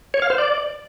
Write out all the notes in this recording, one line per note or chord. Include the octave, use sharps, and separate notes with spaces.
C#5
F5
C5
D5